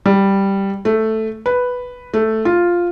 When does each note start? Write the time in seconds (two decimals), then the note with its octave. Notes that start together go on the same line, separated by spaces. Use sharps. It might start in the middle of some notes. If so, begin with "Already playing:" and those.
0.06 G3
0.85 A3
1.46 B4
2.14 A3
2.45 F4